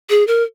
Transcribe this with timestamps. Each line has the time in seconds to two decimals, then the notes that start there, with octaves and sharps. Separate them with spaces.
0.10 G#4
0.27 A#4